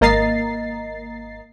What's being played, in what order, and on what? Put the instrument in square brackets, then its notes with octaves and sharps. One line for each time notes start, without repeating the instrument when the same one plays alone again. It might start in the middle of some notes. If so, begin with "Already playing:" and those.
[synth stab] G#1 A#3 D#5 A#5 A6 C7